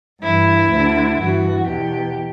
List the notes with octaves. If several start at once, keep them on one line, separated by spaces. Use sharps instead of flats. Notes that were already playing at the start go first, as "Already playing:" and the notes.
G2 E3 E4
D2 D3
G2 E3 F#4
E2 B2 G4